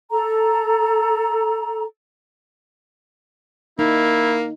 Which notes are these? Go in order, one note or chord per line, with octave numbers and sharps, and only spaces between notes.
A4 A#5
A#3 D#4 E4